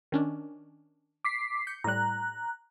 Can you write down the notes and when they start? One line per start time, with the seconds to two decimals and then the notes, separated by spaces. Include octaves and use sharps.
0.12 D#3 C#4 D4
1.25 D6 B6 C7
1.67 G6 C#7
1.84 A2 G3 A#5 F#6